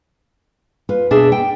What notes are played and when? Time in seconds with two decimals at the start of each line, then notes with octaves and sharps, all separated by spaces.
0.89 F4 B4
1.11 B2 D4 G#4 E5
1.32 G5